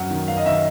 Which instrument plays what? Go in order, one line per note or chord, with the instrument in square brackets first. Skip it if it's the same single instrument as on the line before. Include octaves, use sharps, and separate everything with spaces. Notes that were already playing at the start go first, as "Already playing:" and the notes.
Already playing: [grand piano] F#2 F#5
D#3
F#2 F5
D#5
D#3 E5
D#5